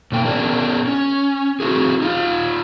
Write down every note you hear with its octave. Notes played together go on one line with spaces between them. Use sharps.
B2 A#3 G5
B3 C#4 D4 G#4 A#4 D5
C#4
C4 E4 F#4 G#4
D#4 F4